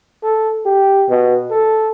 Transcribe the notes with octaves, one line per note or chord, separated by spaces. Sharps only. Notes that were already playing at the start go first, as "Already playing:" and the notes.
A4
G4
B2
A4